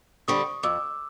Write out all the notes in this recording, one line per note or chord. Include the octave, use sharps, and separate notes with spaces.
D3 G3 C4 C#6 D#6
F2 D6 E6